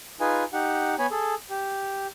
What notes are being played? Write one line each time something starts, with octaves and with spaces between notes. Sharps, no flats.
D#4 F4 G#4 B4 G#5
D#4 G4 F#5
B3 C#5 G#5 B5
G#4 A4
G4